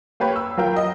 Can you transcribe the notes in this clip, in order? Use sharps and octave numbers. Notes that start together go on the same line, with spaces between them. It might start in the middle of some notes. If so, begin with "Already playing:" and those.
A#3 G4 B4 C#5
E6
F#3 F4 A#4 G5
D#5